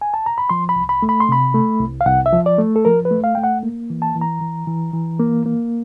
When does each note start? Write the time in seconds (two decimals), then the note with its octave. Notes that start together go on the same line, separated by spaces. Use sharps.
0.01 G#5
0.14 A5
0.26 A#5
0.38 B5
0.49 F3 C6
0.69 B5
0.76 C2
0.89 B5
1.02 A3
1.09 B5
1.20 C6
1.29 C3 B5
1.54 A3
1.80 C2
2.01 F5
2.06 C2 F#5
2.26 E5
2.33 F3
2.46 D5
2.58 A3
2.76 A4
2.85 F3 A#4
3.05 B4
3.11 A3
3.24 F5
3.35 A3 G5
3.43 F#5
3.63 A#3
3.90 E3
4.02 A5
4.15 E3
4.21 A#5
4.41 E3
4.67 E3
4.93 E3
5.19 A#3
5.46 A#3